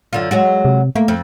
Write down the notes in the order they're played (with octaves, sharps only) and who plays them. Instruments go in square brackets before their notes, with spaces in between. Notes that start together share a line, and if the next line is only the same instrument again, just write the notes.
[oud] F#2 D3 F4
F#3 G#3 F#4
[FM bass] C3
[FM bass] A3 [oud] A#3
[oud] F2